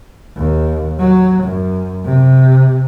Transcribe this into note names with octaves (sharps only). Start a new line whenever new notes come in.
D#2
F#3
F#2
C3